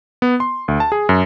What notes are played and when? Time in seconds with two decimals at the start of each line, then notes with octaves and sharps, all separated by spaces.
0.22 B3
0.40 C6
0.68 D2
0.80 A5
0.92 G#4
1.09 F#2